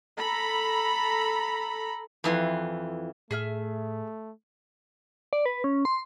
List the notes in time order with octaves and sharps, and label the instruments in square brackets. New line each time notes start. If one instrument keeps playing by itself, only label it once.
[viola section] A4 A#5 B5
[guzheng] F2 E3 C6
[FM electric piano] A2 [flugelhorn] A3 [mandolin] G#4 E5 F6
[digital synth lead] D5
B4
C#4
C6